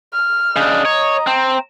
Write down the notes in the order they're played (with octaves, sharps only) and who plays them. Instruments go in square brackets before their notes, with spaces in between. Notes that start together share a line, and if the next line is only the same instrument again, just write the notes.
[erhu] F6
[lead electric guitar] C#3 D4 [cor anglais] D#5
[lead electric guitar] C#5 [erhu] A#5
[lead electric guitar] C4